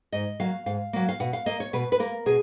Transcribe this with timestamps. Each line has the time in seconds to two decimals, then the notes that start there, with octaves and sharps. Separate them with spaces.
0.12 G#2 D#5
0.40 F#3 A#3 F5
0.66 G#2 F5
0.93 F#3 A#3
1.09 F5
1.20 B2 F#5
1.33 F5
1.46 A#3 D#5
1.60 C#5
1.73 B2 B4
1.92 B4
2.00 A#3 A#4
2.26 B2 G#4